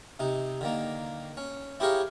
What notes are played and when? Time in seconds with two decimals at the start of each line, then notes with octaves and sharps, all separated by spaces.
0.20 C3 D#4
0.61 D3 D#3 A#3
1.37 C#4
1.80 E4 G4 G#4 A#4 C#5 F5